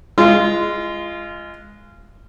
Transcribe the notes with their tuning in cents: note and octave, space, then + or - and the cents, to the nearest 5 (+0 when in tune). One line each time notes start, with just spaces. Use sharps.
G#3 +0 F4 -25